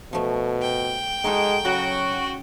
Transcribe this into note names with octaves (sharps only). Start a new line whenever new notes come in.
B2 F3 A3
G5
G#3 D#4 F#4 A4
C#3 F#3 F#4